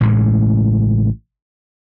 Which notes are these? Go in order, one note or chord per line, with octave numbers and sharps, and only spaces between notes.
A1 A2 C#3 G#3